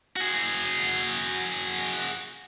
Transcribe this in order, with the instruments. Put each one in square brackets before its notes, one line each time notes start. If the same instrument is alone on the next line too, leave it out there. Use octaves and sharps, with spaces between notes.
[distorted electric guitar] F#4 G#4